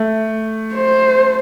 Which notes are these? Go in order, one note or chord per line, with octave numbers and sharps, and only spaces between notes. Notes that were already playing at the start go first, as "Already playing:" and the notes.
Already playing: A3
C5